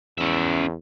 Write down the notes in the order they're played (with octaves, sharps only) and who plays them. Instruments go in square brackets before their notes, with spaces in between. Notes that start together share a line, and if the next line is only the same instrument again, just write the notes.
[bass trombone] E2 [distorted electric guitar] C#4 E5